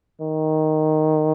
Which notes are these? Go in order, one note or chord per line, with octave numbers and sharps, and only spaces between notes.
D#3